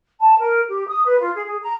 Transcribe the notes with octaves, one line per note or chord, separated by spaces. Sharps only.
A5
A#4
G4
D#6
B4
F4
G#4
G#4
A#5